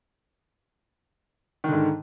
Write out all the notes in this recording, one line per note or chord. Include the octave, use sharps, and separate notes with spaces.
G#2 D3 D#3